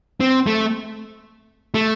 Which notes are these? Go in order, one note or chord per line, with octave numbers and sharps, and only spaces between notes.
C4
A3
A3